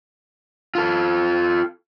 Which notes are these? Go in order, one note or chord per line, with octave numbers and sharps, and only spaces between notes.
F4 A4